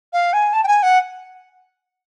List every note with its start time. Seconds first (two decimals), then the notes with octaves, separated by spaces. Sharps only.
0.13 F5
0.33 G#5
0.53 A5
0.63 G5
0.67 G#5
0.83 F#5